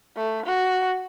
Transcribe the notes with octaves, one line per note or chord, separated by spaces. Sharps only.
A3
F#4